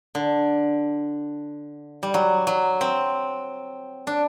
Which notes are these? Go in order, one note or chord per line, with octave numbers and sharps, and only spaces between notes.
D3
G3
F#3
F#3
C4
D4